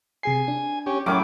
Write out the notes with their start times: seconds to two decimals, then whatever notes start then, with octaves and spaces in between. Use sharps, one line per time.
0.23 C3 G#4 G#5 C7
0.48 D4
0.86 C#4 G4
1.06 A2 F#3 C#4 A#4 G5 A#5 D6